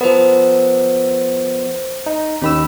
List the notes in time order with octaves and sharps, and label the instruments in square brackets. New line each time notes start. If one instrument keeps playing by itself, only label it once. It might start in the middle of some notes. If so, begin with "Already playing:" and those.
[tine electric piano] F3 B3 [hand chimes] A#4 C5
[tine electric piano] D#4
[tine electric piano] D#2 D#3 E6 [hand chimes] C#4 B5